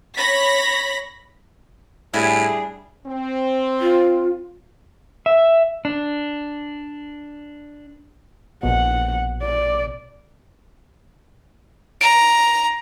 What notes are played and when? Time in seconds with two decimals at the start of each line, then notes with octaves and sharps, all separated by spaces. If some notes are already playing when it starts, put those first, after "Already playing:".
0.16 C#5 B5 A#6 B6
2.14 A2 G3 D4 E4 G#4 G#5
3.06 C4
3.81 F4
5.26 E5
5.85 D4
8.63 A#1 B2 F#5
9.41 D5
12.01 A#5 D7